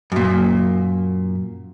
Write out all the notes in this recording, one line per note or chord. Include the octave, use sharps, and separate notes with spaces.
F#2 A#2